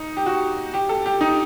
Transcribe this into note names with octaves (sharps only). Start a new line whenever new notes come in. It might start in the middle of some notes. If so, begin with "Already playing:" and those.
Already playing: D#4
G4
F#4
G4
A4
G4
D#4